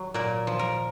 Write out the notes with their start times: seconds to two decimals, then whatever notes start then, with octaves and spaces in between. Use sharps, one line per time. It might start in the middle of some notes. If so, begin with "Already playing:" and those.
Already playing: F#3
0.14 A#2 A#4
0.47 F3
0.59 A#4